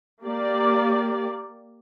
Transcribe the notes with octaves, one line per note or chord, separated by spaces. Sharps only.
A#3 G4 D5